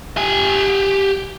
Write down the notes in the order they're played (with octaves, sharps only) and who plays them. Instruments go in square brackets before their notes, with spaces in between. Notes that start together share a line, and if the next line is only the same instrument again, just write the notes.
[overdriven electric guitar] G4 G#5